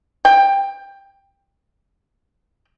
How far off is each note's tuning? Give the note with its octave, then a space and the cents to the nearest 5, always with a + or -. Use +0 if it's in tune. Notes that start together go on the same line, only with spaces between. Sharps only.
G5 +15